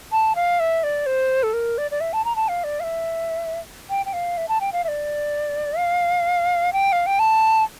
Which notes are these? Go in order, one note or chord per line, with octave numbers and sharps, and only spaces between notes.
A5
F5
E5
D5
C5
A4
A#4
D5
D5
E5
A5
A#5
A5
F5
D5
F5
E5
G5
G5
F5
E5
A5
G5
F5
E5
D5
F5
G5
F5
G5
A5